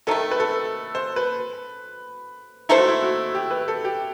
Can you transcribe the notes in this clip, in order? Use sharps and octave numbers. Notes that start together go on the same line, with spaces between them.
C3 D#3 A3 A4
B4
A4
C5
B4
A3 D#4 E4 A4 C5
F#4
E4
F#4
G4
B4
A4
G4